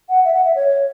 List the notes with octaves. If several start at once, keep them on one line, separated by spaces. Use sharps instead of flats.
F#5
E5
F#5
E5
C#5